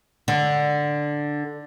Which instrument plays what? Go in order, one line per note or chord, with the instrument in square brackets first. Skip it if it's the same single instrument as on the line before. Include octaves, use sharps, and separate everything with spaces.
[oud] D3